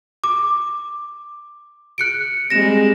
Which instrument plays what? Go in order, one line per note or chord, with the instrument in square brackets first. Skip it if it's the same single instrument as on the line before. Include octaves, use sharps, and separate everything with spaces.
[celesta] D6
F#6 C#7 D7
[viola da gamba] G3 G#3 C4 [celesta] A#6 E7